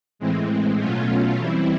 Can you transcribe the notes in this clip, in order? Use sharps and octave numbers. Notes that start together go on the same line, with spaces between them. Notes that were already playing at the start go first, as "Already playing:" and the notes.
A2 E3 G#3 C4
B2 F#3 A3 C#4 F4
E3 G3 C4 E4